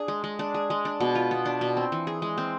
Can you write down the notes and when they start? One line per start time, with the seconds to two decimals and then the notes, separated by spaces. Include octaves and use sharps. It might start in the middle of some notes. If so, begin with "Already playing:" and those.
Already playing: D4 G#4
0.08 G#3
0.24 G#3
0.39 D4
0.54 G#4
0.70 G#3
0.85 D4
1.00 B2
1.15 F4
1.31 B3
1.45 D4
1.61 B2
1.77 C4
1.92 E3
2.07 G#4
2.22 G#3
2.38 C4